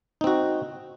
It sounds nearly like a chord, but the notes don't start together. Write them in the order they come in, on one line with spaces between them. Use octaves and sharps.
D#4 C4 F#4